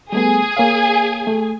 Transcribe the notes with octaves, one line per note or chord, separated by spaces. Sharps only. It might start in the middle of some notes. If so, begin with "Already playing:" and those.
G3 A3 B3 G#4 G#5
A#3 C#5 F5
A3